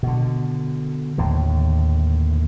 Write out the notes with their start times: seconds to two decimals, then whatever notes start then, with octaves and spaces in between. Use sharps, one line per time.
0.03 B2 D3
1.18 D#2 A2 D3